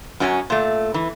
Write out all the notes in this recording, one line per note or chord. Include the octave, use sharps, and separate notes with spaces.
F#2 F#3 C#4 F4 G#5
A#2 A3
E3